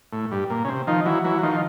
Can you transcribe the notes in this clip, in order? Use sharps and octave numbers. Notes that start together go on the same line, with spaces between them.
A2
G2
A#2
C#3
C3
D#3 F3
E3 F#3
E3 F#3
F#3
D#3 F3
F3